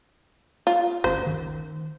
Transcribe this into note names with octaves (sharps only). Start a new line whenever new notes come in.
F4
G1 D2 C#4 C5
D#3